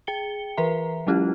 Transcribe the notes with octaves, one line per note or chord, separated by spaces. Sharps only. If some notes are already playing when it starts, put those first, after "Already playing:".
G#4 G5 C#7 G7
E3 A#4 B4 E5 A#5
F#3 G#3 C#4 E4 F4 G4